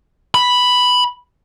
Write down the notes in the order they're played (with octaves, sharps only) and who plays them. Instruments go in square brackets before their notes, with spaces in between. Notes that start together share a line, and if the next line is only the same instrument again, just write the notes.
[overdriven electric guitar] B5